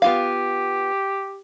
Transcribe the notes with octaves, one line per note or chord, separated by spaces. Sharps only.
B3 F4 G4 F5